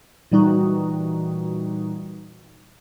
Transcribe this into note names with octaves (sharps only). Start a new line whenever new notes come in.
A#2 E3 G3 D#4 F#4